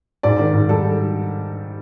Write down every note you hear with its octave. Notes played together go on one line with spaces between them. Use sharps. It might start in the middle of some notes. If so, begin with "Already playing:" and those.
G#2 D5
D#3
G#2
G3 A4